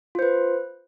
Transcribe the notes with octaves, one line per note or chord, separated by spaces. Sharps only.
F4 B4 C5